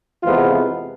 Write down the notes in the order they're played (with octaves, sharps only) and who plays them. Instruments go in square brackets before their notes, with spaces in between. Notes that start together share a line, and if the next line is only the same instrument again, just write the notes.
[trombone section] F2 C3 E3 G#3 B3 F4